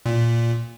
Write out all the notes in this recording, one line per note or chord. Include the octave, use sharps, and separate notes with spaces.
A#2